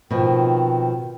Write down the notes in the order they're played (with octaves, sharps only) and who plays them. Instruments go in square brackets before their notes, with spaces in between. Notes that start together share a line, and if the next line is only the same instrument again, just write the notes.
[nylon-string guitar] B2 F3 [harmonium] D#3 C4